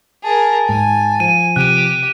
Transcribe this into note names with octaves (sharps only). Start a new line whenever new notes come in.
G#4 A#4 A5
G#2 G#5
F3 D#7
C3 G4 F#6 D#7